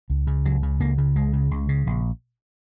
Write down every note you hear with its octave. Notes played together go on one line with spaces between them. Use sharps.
C#2
C#3
C#2 F#3
C#3
C#2 A#3
C#3
C#2 G#3
C#3
C#2
C#3
A#1